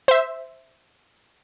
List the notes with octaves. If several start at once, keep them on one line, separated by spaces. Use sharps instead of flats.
C5 E5